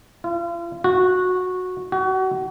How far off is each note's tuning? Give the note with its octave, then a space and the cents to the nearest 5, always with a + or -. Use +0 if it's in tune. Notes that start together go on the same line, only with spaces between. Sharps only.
F4 -40
F#4 -15
F#4 +30